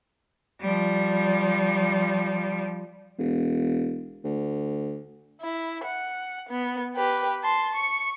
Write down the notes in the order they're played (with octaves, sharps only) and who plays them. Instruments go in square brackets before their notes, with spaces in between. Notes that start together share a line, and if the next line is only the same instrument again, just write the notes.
[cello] F3 G3
[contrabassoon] E1
D2
[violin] E4
F#5
B3
G4 B4
A5 C6
C#6 C#7